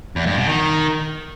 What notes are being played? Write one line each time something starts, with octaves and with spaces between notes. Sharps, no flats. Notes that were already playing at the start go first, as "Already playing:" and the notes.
E2
G2
B2
D#3